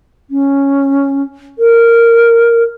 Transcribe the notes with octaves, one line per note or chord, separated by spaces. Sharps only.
C#4
A#4